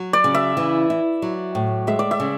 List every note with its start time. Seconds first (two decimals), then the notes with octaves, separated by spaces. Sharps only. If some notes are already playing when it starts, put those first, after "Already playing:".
Already playing: F#3 F#4
0.13 D5
0.24 C#3
0.34 E5
0.57 E3
0.90 E4
1.22 F#3
1.55 A2
1.87 G#3 E5
1.99 D5
2.11 E5
2.20 C#3